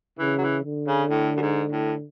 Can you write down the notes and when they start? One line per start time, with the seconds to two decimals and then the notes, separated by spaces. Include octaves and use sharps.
0.19 C#3 E3
0.38 F#3
0.42 E3
0.65 D3
0.87 C#3
1.10 A2
1.37 F#2
1.42 G#2
1.72 A2